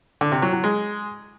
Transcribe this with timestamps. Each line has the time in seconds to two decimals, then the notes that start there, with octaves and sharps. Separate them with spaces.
0.21 D3
0.32 C3
0.42 F#3
0.53 F#3
0.64 G#3